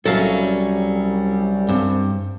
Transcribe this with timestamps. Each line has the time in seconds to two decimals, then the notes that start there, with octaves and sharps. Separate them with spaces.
0.06 C2 F#3 G3 C#4 A4 E5 F5
1.69 G2 C4